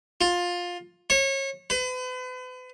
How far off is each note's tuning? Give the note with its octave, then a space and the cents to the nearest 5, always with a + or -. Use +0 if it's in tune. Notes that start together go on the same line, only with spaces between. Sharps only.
F4 +15
C#5 -30
B4 +40